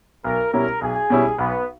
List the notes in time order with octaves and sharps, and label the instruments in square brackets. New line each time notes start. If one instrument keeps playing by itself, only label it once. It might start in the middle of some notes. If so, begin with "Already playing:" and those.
[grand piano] B1 [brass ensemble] A#4
[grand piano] B2 G3 C#4 E4 [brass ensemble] A#4
[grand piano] B1 [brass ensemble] G#4
[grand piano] B2 G3 C#4 E4
[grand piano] B1 [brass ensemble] B3